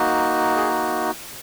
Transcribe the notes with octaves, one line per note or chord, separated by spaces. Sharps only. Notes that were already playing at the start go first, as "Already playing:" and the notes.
Already playing: A#3 D#4 F#4
G#4